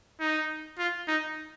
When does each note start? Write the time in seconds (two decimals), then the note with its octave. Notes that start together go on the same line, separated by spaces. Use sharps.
0.20 D#4
0.78 F4
1.08 D#4